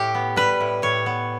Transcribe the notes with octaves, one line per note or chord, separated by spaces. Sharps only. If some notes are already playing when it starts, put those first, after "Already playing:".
Already playing: A2 G4
B3
G3 B4
A2
A2 C#5
B3